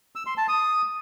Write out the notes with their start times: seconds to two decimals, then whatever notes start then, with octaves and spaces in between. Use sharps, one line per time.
0.15 E6
0.26 C6
0.37 A5
0.48 D#6